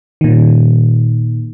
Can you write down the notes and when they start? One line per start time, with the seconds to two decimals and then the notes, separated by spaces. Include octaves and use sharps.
0.21 A#2 D#3